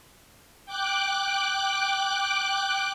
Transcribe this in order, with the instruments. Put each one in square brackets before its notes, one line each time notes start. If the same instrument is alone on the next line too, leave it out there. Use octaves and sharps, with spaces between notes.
[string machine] G5 D6 F#6